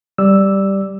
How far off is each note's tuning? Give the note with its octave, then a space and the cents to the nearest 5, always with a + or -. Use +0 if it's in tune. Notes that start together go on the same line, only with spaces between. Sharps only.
G3 +0 D5 +0 E6 +0